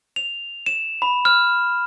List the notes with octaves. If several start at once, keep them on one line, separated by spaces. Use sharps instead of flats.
F7
E7
B5
F6